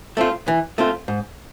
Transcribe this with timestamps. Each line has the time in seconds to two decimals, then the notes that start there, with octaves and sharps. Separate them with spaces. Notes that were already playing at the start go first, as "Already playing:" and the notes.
0.17 A3 C4 F4
0.48 E3
0.78 A3 C4 F4
1.08 G#2